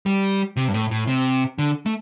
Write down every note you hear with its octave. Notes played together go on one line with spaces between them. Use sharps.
G3
C3
G2
A2
A2
C3
D3
A3